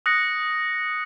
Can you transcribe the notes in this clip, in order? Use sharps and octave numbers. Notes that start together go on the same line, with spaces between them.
D#6 F#6 A#6 C#7